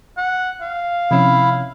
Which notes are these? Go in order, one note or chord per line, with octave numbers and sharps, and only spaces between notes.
F#5
F5
C3 F3 C#4 E4